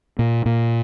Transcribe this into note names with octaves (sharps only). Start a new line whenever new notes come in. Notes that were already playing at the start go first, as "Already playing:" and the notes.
A#2
A#2